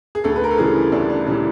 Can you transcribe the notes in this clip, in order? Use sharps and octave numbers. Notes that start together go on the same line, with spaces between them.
G#4
D2 A4
B4
A#4
A4
C#3 E3 G3 G#4
D2 D4
D4
C#3 E3 G3 D4